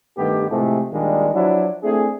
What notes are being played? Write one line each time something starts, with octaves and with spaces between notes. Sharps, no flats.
G2 D#3 A3 B3 G4
A2 C3 F3 G#3 A3
A#1 D#3 G3 G#3 D4 F4
F3 F#3 D4 E4 F#4
A3 C4 D4 E4 G#4